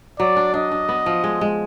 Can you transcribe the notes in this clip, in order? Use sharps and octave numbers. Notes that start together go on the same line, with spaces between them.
F#3 D5
D4
D4 D#5
D4
B3
F3
G#3
G#3